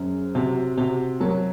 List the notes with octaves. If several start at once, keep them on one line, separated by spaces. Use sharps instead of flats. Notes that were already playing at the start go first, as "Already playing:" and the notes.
Already playing: F#2 G#4 C5
C3 F#4
C3 F#4
F#3 A#4